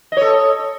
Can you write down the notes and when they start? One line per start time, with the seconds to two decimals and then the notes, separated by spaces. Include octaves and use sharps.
0.12 D#5
0.17 C#5
0.21 A4